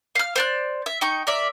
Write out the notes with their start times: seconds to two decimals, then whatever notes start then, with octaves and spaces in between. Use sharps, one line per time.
0.15 F5 F6
0.36 C5 D5 F#6
0.86 E5
1.01 D#4 G5 C#6
1.27 A#4 D5 E5